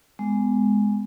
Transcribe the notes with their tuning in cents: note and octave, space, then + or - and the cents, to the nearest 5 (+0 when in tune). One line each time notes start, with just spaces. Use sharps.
G#3 +0 B3 +20